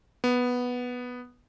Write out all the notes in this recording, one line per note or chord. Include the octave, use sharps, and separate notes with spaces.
B3